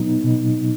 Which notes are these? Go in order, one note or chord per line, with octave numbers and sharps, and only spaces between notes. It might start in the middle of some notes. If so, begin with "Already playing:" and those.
Already playing: B2 F#3 B3 D#4
B2